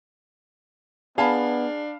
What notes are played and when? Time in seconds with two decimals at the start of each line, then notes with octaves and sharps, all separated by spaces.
1.18 B3 D4 G#4 F5 A5 B5